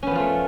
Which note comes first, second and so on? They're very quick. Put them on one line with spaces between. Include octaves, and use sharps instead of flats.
C#4 B3 F3 F4 A3